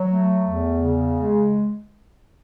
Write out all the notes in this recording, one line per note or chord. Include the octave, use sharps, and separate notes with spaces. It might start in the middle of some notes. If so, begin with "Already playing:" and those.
Already playing: F#3
A3
E2
C#3
G#3